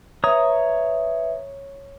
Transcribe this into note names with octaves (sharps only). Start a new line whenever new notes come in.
B4 C#5 E5 A#5 D#6